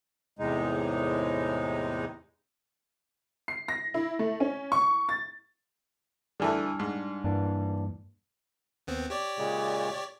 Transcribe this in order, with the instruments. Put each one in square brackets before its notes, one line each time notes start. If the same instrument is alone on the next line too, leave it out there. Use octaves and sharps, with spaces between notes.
[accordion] E2 A2 C3 G#3 D#4
[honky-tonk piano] C7
A#6
E4
A3
C#4
C#6
A6
[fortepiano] D3 E3 A3 [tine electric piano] G3 D4 F6
[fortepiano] G#2
[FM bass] G2 [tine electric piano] E3 A#3 D4
[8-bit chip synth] D#2 B3 C4
G4 C#5 D5
[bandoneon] A#2 C#3 G#3